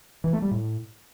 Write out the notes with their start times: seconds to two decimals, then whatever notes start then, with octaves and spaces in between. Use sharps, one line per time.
0.24 E3
0.33 A3
0.42 G3
0.51 A2